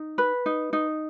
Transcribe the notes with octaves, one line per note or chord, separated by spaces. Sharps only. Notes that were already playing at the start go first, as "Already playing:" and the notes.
Already playing: D#4
B4
D#4
D#4